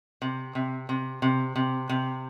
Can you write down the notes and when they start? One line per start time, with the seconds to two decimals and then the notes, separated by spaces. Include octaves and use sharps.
0.22 C3
0.55 C3
0.89 C3
1.22 C3
1.56 C3
1.89 C3